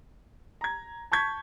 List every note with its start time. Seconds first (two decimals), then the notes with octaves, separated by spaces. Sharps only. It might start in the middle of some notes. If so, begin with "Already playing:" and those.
0.61 A#5 G#6
1.12 A5 C#6 G6 G#6 B6